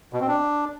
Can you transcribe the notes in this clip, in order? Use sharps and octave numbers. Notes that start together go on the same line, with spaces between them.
B2
C4
D4